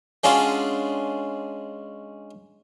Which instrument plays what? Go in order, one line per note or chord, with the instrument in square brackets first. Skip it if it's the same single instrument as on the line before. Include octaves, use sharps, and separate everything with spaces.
[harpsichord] G#3 C#4 D4 F4 F#4 G#4